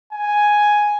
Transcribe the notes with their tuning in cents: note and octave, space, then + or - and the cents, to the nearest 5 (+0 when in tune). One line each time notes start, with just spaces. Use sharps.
G#5 +5